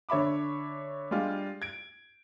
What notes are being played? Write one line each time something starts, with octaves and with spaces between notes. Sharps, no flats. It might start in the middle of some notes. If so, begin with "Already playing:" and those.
D3 C#5 E5 B5 D6
G3 G#3 D4 F4
G#6 D7